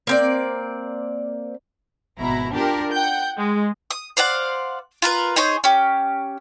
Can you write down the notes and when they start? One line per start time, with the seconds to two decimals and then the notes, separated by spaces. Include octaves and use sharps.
0.07 A#3 C4 D5
2.18 G#1 B2 E4 A#5
2.52 D4 F4 G4 A#4
2.92 F#5 G5 G6
3.36 G#3
3.91 D#6
4.17 C5 D5 F5 F#5
5.02 F4 A#4 B4
5.36 D#4 G#4 C5 C#5
5.64 C#4 G4